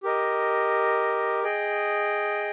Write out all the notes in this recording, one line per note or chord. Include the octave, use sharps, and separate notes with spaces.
G4 A#4 D#5
G#4 D#5 G5